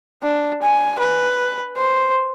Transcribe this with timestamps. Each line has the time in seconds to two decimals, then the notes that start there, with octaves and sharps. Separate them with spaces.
0.23 D4
0.63 G#5
0.99 B4
1.77 C5